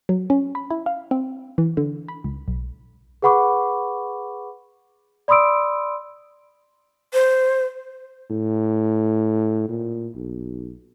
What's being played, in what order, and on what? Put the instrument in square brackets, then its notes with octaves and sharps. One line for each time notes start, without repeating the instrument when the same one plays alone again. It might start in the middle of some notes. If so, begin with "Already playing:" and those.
[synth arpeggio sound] F#3
C#4
B5
E4
F5
C4
E3
D3
B5
C#2
B1
[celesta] G#4 B4 F#5 B5 C#6 D6
D5 B5 C6 D#6 E6 D7
[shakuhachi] C5
[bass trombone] A2
A#2
B1